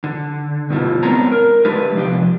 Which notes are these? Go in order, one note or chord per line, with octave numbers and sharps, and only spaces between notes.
D3
G2 B2 D3 G3 E4 F4
G#3 B3 C4 D4 C#5 A#5
A#4
D3 G#3 D4 G4 B4 E5
C3 F3 D4 G4